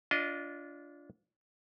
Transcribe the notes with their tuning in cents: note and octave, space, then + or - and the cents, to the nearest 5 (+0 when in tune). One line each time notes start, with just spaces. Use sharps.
D4 -25 F4 +0 D#5 +0